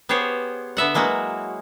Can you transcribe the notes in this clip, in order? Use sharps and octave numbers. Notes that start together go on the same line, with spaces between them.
B3 G4 G#4 C5 C#5
D3 B3 E5 F#5
F#3 G#3 A#3 E4 F#4